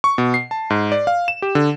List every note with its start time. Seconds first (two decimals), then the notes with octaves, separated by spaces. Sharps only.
0.04 C#6
0.18 B2
0.34 C7
0.51 A5
0.70 G#2
0.92 D5
1.07 F5
1.28 E7
1.42 G4
1.55 D3